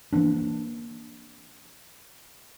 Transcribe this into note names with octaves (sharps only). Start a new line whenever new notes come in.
E3 A#3 C4 D4